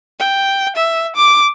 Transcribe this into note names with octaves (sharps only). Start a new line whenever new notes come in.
G5
E5
D6